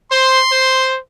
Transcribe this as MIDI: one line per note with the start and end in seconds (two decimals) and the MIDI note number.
0.11 0.40 72
0.11 0.89 84
0.52 0.99 72